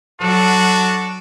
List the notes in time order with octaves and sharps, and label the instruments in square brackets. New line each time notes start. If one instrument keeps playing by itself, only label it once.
[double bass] F#3 [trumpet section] D4 F#4 [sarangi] A4